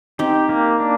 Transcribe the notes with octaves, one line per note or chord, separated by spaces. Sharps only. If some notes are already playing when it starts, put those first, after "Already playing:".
C4 D#4 G4
A#3
D4